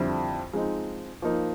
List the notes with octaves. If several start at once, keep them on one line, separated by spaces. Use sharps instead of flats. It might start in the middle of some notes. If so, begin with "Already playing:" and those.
Already playing: F2 D3 G3 C4 E4
F3 G#3 C4 D#4
F3 A#3 D#4